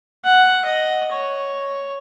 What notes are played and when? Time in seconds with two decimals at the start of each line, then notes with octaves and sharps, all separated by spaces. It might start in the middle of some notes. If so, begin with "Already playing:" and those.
0.25 F#5
0.65 D#5
1.11 C#5